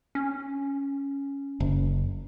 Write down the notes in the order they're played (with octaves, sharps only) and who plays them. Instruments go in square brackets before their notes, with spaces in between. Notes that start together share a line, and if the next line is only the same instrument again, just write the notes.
[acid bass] C#4
[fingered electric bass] F#1